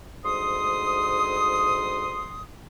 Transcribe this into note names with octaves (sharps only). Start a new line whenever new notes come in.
D2 G#2 C6 D#6